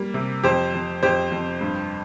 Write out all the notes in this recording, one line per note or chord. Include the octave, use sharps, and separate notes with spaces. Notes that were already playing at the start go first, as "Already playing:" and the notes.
Already playing: G3 A#3
C3
F2 G4 C5
F2
F2 G4 C5
F2
G2